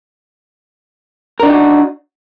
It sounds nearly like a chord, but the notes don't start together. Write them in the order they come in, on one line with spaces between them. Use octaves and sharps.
A#4 D4 D#4 G4 F#4